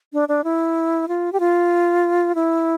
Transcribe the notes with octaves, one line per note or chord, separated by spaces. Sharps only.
D4
D4
E4
F4
G4
F4
E4